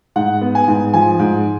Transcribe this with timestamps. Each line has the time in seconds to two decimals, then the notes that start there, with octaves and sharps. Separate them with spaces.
0.16 G#2 F#5
0.41 B3
0.55 G#5
0.68 G#2
0.93 F3 G#5
1.19 G#2